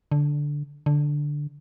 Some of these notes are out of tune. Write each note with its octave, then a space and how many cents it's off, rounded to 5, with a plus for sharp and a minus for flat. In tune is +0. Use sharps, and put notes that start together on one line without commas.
D3 -5
D3 +0